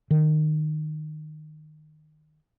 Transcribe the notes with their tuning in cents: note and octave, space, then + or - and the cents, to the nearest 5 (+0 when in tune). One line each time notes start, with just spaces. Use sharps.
D#3 -20